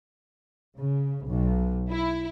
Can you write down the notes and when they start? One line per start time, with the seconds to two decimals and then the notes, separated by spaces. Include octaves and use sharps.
0.78 C#3
1.26 B1
1.90 E4